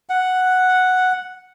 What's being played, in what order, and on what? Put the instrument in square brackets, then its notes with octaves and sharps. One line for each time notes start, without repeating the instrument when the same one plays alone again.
[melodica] F#5